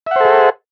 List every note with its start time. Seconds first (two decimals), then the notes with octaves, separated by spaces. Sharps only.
0.07 E5
0.11 F#5
0.16 C5
0.20 A4
0.25 G#4